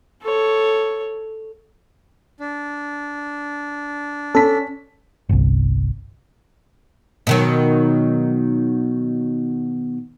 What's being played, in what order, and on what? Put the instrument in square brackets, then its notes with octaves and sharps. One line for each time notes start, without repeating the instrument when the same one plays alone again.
[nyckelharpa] A4 C#5
[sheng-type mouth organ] D4
[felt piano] C#4 B6 [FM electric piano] A4
[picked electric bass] G1 C2
[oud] B2 D#3 F#3